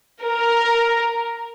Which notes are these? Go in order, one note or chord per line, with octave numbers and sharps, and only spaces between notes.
A#4